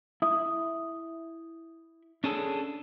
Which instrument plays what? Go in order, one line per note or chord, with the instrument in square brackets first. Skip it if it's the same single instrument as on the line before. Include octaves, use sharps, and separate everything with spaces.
[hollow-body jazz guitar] E4 E5 [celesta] D#6
[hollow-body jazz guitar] C#4 [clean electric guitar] D4 G#4 A4